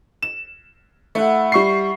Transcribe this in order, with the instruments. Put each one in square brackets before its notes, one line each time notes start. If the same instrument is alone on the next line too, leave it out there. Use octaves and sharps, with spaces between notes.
[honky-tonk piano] E7
[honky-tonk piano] A3 [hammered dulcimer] E4 F#5
[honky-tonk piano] G3 C#6 C7